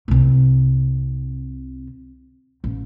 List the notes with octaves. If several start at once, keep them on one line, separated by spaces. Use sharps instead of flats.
C2 C3
A1